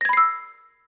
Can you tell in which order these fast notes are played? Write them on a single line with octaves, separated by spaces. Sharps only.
A#6 G#6 B5 C7 E6